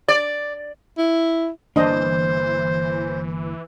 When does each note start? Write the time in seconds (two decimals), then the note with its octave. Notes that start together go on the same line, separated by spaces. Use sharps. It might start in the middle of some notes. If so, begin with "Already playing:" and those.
0.08 D5
0.98 E4
1.76 G1 E3 A#3 D4 C5 D#5